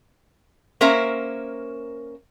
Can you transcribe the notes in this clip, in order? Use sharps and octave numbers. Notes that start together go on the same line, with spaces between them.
A#3 C#4 A#4 C5 E5 A#5